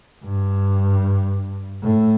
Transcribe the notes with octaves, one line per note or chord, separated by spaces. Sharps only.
G2
A2